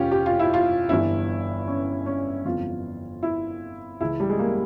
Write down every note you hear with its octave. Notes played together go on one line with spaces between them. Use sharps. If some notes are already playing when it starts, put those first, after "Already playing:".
Already playing: F1 C#4 F4 G4
G4
F4
E4
F4
G1 G2 E3 E4
C#4
C#4
G1 F2 E3 F4
E4
C#2 C#3 E3 E4
G3
G#3
A#3